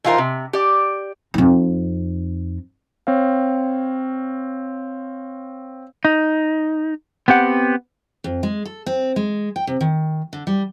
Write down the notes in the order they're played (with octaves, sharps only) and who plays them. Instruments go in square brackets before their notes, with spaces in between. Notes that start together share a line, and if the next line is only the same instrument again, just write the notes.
[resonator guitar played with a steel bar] E3 D#4 F4 G4 A#4 C5
C3
G4 D5
[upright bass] F2 D#4
[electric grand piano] C4 C#5 F5
[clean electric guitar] D#4
B3 C4 G4 F#5
[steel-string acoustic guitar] F2
G#3
A4
C4
G#3
G5
C3
D#3
D3
G3